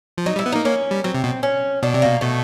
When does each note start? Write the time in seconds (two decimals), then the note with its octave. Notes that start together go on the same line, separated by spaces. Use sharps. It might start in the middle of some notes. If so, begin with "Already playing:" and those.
0.18 F3
0.26 F#3 D#4
0.36 G3
0.39 E4
0.46 B3
0.52 A#3 D#4
0.65 A#3 C#4
0.91 G3
1.04 F#3 C4
1.14 C3
1.24 B2
1.43 C#4
1.83 B2 D4
1.94 C3
2.02 B2 A#3
2.21 B2 A3